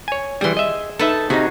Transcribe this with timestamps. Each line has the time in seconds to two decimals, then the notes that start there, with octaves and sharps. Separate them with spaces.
0.08 C#5 G#5
0.41 E3 G3 G#4 C6
0.57 D#5 E5
0.99 D#4 A4 B4 E5 A5
1.30 C3 D#4 F#4 G#4